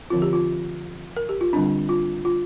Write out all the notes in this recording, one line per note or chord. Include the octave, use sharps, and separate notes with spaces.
D3 F3 C4 F4
G4
F4
A#4
G4
F4
D3 G3 C4 D4
F4
F4